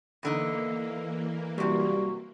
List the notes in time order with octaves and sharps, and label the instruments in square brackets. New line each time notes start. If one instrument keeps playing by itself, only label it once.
[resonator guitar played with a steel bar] E2 D3 D#4 [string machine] E3 A#3
[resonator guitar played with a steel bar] F#2 C3 [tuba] G3 [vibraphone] F#4 C#6